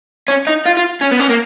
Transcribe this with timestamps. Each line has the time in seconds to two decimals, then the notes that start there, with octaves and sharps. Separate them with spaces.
0.28 C#4
0.47 D#4
0.65 F4
0.77 F4
1.01 C#4
1.12 B3
1.20 C#4
1.30 A#3